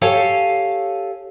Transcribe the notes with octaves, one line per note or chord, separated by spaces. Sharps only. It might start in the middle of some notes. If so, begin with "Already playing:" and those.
G4 A4 C#5 F5 G#5 A5